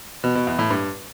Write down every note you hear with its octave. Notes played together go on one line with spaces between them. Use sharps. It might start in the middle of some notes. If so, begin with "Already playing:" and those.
B2
B2
E2
A2
G2